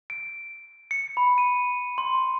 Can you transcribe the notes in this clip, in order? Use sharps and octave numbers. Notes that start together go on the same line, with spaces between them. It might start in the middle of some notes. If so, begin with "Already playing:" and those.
D7
C#7
B5
D#7
C6